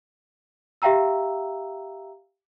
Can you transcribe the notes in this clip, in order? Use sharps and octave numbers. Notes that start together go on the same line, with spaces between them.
G4 E5 F5 G5 A#5 E6